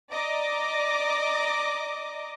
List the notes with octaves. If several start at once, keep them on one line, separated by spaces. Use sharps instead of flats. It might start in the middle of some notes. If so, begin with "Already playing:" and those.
D5 D#5 A#5 D6